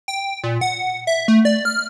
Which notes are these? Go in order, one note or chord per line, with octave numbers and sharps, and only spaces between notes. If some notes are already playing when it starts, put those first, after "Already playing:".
G5
A#2
F#5
E5
A3
D5
F6